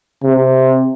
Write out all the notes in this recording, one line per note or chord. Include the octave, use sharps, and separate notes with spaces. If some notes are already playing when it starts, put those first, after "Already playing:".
C3